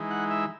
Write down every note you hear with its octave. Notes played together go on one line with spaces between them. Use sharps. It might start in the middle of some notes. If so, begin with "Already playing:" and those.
Already playing: E3 G#3 D#4
F#5
E5